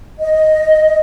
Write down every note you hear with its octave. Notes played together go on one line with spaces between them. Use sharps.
D#5